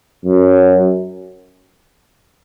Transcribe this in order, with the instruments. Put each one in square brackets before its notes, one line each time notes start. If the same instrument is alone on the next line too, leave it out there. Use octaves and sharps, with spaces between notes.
[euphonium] F#2